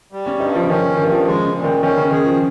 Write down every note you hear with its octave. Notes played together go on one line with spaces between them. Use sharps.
G3
C#4
G2 D#4
F3
C#3
D#3 C#4
C#3
G2 D#3
D#3
F3
F3 G#3
C#3
A#2
D#3
D#3 C#4
C#3
D#3 G#4
F3